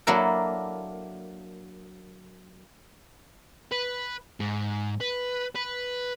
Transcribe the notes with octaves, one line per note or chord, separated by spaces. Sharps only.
F#3 A#3 D4 E4 A4 A#4
B4
G#2
B4
B4